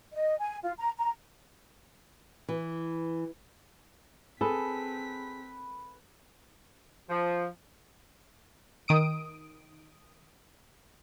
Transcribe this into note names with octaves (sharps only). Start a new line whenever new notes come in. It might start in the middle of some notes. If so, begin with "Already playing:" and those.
D#5
G#5
F4
A#5
A#5
E3
C4 G#4 A4 B4 B6
F3
D#3 D#6 D7